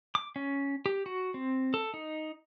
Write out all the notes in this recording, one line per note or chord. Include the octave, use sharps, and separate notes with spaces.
D6
C#4
G4
F#4
C4
A4
D#4